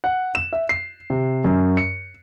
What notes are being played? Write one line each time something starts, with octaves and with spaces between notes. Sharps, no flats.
F#5
E7
E5
C7
C3
F#2
C#7